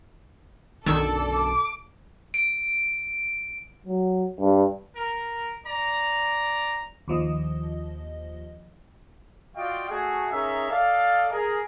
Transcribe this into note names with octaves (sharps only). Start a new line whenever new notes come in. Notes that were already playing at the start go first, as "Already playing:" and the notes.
B1 F#2 D3 D#3 A4 D5 E6 G#6
D6
D7
F#3
G2
A#4
D5 A#5
D#2 F3 D#5
F4 F#4 D5 D#5 F5 G5
A3 F#4 G#4
C#4 D#4 G#4 A#4 E5
A4 D5 D#5 F5
G#4 A#4